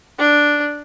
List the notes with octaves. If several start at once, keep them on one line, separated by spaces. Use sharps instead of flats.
D4